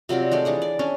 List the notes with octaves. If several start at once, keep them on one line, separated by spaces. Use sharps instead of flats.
C3 F#3 F4 D5
G#3 A3 G4 D5
E3 D4 G#4 F#5
D5
C#4 D4 G#5